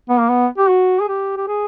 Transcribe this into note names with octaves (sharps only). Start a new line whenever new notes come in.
B3
A#3
B3
G4
F#4
G#4
G4
G4
G#4